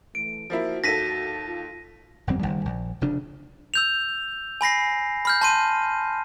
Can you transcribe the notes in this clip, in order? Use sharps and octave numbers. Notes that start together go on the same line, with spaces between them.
E3 A3 D7
F3 A#3 E4 F#4
D#2 A4 A#6 B6 D#7
F4
G1 F2 G3 C4
F#1 E2 D#3 G3
A#1
F1 F2 C#3 D4
E6 G6 F7
G#5 B5 A#6 C7
B5 F6 G6
A5 C6 D#7